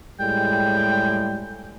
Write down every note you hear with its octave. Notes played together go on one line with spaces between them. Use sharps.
A2 G3 G#3 G5